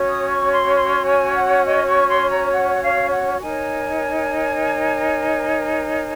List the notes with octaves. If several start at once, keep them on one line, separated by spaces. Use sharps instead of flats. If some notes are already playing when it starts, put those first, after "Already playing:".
Already playing: C#4 F#4 C#5
D#6
C#6
C6
C6
G#5
F#5
D#5
C#6
C6
A#5
F#5
F5
F#5
D#4 A#4 C#5 G#5